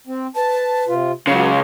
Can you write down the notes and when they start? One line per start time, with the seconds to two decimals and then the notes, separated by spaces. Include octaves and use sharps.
0.07 C4
0.36 B4 A5
0.88 C3 F4
1.27 C#2 C#3 F#3 F5